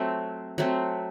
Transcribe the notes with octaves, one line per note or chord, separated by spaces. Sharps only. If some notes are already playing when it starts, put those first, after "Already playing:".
Already playing: F#3 A3 C4
F#3 A3 C4